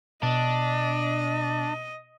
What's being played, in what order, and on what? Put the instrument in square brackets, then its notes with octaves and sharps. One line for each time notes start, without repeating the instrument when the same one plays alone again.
[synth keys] B2 [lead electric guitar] D4 [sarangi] D#5